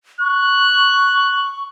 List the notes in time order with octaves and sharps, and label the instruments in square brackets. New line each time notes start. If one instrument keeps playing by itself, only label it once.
[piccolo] C#6 [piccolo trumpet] F#6